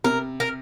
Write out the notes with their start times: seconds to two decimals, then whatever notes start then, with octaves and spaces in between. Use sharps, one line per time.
0.04 C3 A#4
0.40 A#4